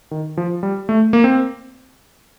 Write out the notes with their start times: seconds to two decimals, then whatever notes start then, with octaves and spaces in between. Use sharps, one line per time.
0.11 D#3
0.37 F3
0.63 G3
0.89 A3
1.13 A#3
1.24 C4